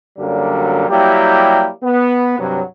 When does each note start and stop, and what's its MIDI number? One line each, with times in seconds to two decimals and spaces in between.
0.18 0.86 42
0.18 0.86 50
0.18 0.86 54
0.18 0.86 55
0.18 0.86 58
0.89 1.69 54
0.89 1.69 55
0.89 1.69 58
0.89 1.69 64
0.89 1.69 67
1.83 2.35 59
2.39 2.61 43
2.39 2.61 48
2.39 2.61 54